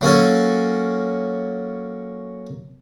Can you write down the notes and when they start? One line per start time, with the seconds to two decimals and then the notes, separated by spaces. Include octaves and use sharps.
0.01 F#3 A#3 C#4 A4